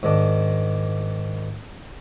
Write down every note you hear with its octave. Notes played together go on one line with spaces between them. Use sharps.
G#2 D#3 D4